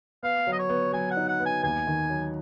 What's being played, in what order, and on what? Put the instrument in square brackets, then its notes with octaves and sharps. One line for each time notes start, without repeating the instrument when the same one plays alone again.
[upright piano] B3 [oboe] F5
[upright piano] F#3
[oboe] D#5
C#5
[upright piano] B3
[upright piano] F#3 [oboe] G#5
[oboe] F#5
[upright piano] D#4
[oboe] F#5
[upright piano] B3
[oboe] G#5
[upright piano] D#2 [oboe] G#5
[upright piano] D#3
F#3